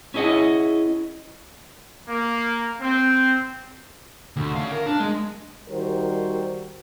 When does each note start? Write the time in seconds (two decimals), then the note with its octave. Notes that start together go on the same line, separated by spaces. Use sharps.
0.14 C#4 E4 G#4 D#5 F#5
2.07 A#3
2.79 C4
4.36 D2
4.56 C#4 F5
4.72 A#4
4.86 D4
5.00 G#3
5.69 D#3 G3 F#4 A#4 C5